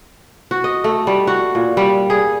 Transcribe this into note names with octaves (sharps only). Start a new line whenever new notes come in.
F#4
D#5
A3
G3
F#4
A#2
G3
G#4